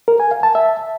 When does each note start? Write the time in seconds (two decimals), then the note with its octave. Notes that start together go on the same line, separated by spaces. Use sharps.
0.08 A#4
0.20 G#5
0.31 F5
0.43 A5
0.55 E5